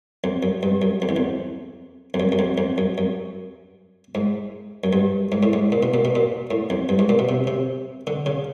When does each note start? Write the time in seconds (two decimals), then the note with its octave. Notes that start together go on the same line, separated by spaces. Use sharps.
0.24 F2
0.43 F#2
0.63 G2
0.82 F#2
1.02 F2
1.09 E2
1.16 F2
2.14 F2
2.20 F#2
2.32 F#2
2.39 F2
2.58 F2
2.78 F#2
2.98 F#2
4.15 G#2
4.84 F#2
4.93 G2
5.32 G#2
5.43 A2
5.53 G#2
5.72 A#2
5.83 B2
5.94 A#2
6.05 B2
6.15 A#2
6.51 A2
6.70 F2
6.89 G2
6.99 G#2
7.09 A#2
7.19 B2
7.29 C3
7.47 C3
8.07 D3
8.26 C#3